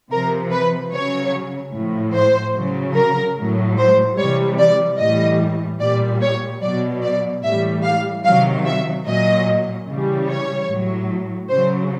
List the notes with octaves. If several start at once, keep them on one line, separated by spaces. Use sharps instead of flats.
C3 F3 A#4
B4
C#3 F#3 C#5
A2 F3
C5
C#3 F#3
A#4
A2 F#3
C5
C3 E3 G3 C#5
D5
A2 E3 G3 D#5
A#2 G3 D5
C#5
B2 F#3 D5
D5
A2 E3 G3 E5
F5
C3 D#3 F#3 F5
E5
A#2 F#3 D#5
C#3 E3 G3
C#5
A2 F#3
C#3 F#3 C5